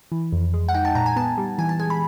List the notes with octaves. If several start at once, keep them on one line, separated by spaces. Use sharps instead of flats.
E3
F2
G#3
F#5
D#4 G5
A5
A#2 A#5
G#5
B3 A5
G3
E3 G#5
A5
G#3 G#5
B5